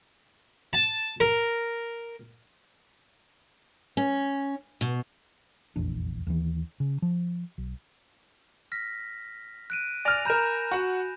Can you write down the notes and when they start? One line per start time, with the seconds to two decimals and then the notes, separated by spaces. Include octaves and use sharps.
0.73 A5
1.20 A#4
3.97 C#4
4.81 B2
5.76 F1 A#1 E2 D4
6.27 D#2 E3
6.80 C#3
7.02 F3
7.58 B1
8.72 F6 A#6 B6
9.70 F#6 D7 D#7
10.05 D5 G#5 F6 A#6 F7
10.25 A#4 A#5 B5 G6 E7
10.71 F#4 F#5